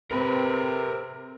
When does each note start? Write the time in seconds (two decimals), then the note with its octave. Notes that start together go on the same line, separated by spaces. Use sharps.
0.11 C3 C4 A#4 B4